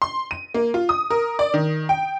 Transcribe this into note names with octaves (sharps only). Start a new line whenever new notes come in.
C6
D#7
A#3
F4
D#6
A#4
D5
D#3
G5